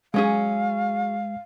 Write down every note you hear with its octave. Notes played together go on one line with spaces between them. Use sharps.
F#3 G#3 C#4 G#4 F5